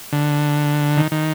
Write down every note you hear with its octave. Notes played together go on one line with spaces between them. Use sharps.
D3
D#3
D#3